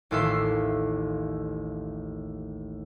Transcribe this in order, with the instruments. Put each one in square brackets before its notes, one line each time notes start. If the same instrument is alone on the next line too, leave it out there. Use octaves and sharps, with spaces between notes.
[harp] A1 D#2 F4 A4 E5 C7